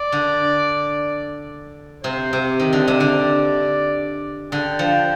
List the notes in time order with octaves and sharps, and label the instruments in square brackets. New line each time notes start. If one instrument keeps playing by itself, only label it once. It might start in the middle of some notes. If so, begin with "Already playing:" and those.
Already playing: [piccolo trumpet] D5
[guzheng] D3
[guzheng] C3 [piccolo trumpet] C5
[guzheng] C3
D#3
D3
[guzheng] C3 [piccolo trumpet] D5
[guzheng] D3
[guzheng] D3 [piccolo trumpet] G5
[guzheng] F3